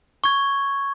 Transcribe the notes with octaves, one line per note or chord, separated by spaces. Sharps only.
C#6 G#6